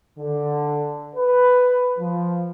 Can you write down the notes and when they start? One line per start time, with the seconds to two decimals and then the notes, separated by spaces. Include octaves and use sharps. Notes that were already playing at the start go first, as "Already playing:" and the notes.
0.19 D3
1.16 B4
1.99 F3